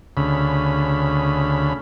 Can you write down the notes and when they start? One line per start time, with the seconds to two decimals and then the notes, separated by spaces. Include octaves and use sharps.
0.17 D2 C#3 B5